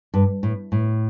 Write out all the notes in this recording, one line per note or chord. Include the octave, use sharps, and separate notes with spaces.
G2
A2
A2